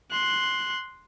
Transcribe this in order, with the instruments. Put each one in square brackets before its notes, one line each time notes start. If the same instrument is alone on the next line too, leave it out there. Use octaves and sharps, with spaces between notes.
[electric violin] C6 F#6